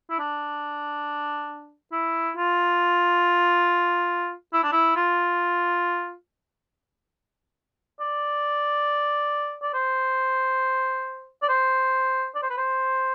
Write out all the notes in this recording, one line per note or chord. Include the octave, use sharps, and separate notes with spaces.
E4
D4
E4
F4
E4
D4
E4
F4
D5
D5
C5
D5
C5
D5
C5
B4
C5